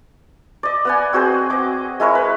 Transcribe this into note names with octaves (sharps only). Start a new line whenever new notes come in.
D5 D#5
B3 F#5 G#5
C4 F#4 G#4 C5
D#5 D6
G#3 E4 A#4 C#5
B4